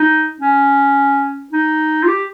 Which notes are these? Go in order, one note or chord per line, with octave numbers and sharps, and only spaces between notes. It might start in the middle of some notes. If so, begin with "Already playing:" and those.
Already playing: D#4
C#4
D#4
F4
G4